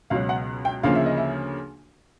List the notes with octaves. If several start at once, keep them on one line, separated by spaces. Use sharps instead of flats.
C#2 B2 F#3 F5
F#5
G5
D2 C#3 F3 A#3 F5
E5
D#5
E5